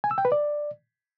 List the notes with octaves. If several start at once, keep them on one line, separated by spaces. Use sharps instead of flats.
G#5
E6
G5
B4
D5